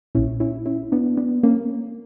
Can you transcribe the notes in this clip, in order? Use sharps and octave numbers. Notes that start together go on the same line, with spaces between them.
A#1 A#2 C#4 E4
C#4 E4
C#4 E4
B3 D4
B3 D4
A#3 C#4